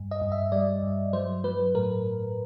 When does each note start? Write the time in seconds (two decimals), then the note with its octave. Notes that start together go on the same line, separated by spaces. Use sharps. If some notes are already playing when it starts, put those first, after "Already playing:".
Already playing: G2
0.11 D#5
0.22 G2
0.32 E5
0.52 G3 D5
0.83 G2
1.13 F#3 C5
1.44 F#3 B4
1.75 A2 A#4